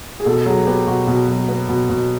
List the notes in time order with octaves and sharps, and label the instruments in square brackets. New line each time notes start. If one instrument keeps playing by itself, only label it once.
[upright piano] G#4
B2 A4
F#3 G#4
B3 G4
B2 F#4
B2
F#3
B3
B2
B2